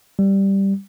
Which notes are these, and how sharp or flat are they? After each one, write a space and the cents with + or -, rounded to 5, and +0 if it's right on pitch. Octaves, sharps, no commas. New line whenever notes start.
G3 +0